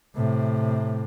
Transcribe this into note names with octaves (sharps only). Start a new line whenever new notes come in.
A2 C3